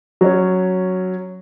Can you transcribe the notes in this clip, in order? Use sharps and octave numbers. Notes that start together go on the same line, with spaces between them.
F#3 C#4